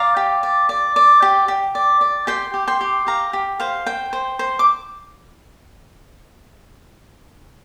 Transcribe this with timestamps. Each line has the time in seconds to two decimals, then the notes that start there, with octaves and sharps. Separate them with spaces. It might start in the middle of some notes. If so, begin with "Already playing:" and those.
Already playing: D5 F5 A#5
0.17 G4
0.43 D5
0.69 D5
0.96 D5
1.22 G4
1.48 G4
1.75 D5
2.01 D5
2.27 G4 G5 C6
2.54 G4
2.68 G5 C6
2.81 G4
3.07 G4 F5 A#5
3.33 G4
3.60 C5 F5
3.86 C5 G5
4.13 C5
4.39 C5
4.59 D6